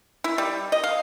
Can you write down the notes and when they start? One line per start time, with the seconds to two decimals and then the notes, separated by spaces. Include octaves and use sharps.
0.24 E4
0.38 G3
0.72 D#5
0.84 F5